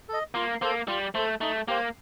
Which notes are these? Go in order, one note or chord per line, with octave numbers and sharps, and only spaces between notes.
A4 D#5
A#3 F4
A#3 A4 C5
G3 F4
A3 A4 C5
A3 D#4
A#3 G4 C5 F5